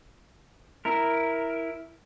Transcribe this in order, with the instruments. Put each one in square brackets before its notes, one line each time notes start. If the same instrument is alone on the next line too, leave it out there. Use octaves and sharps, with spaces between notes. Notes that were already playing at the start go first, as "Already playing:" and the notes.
[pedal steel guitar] E4 A#4